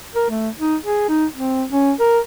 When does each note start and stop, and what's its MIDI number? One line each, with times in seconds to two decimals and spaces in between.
0.15 0.27 70
0.30 0.49 57
0.59 0.76 63
0.85 1.08 68
1.09 1.25 63
1.36 1.63 60
1.72 1.92 61
2.00 2.18 70